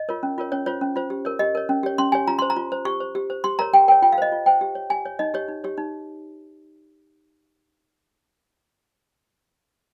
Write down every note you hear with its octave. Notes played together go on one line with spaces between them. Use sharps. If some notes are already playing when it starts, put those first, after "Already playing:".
Already playing: D#5
F4 A#4 C#5
C#4
F4 A#4 C#5
C#4 C#5
F4 C5 C#5
C#4
F4 C5
G4
A#4 C#5
G4 D#5
A#4 C#5
C#4
G4 C#5
C#4 C6
G4 C#5 G#5
F4 A#5
C5 C6
A#5
F4
C5
G4 C#6
C5
G4
C5
G4 C6
A#4 C#5 A#5
G4 G5
A#4 C#5 G5
F4 G5
F5
C5 D#5
F4
C5 G5
G4
C#5
G4 G#5
C#5
D#4 D#5
G4 C#5
D#4
G4 C#5
D#4